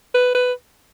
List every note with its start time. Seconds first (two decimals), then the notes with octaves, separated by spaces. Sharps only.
0.14 B4
0.35 B4